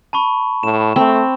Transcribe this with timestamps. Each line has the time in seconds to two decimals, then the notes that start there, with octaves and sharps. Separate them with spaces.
0.13 A5 B5 C#6
0.63 A2 E7
0.96 A3 C4